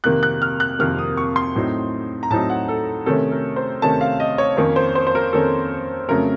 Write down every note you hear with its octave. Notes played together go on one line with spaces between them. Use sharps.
F2 C3 D#3 A#3 F#6
F#6
F6
F#6
F2 C3 D#3 A#3 F6
D#6
C#6
C6
A2 F#3 C4 D#4
A#5
A2 F#3 C4 D#4 A5
F#5
A4
C3 D#3 A3 C#4 A4
A#4
C5
C3 D#3 A3 C#4 A5
F5
D#5
C#5
F2 D#3 A#3 C#4 C#5
C5
C5
C5
A#4
F2 D#3 A#3 C#4 A4
F2 C#3 F#3 A3 A#4